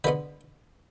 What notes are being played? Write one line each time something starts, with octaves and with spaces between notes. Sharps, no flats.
D3 G#3 B3 B4